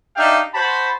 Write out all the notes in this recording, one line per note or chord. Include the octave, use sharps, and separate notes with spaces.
D4 D#4 G4 E5 F5 G5
F#4 C5 A5 B5